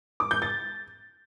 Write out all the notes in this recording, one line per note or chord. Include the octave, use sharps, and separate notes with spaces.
D6
G6
A6